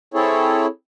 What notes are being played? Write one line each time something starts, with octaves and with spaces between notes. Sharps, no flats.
C4 E4 G#4 A4 C#5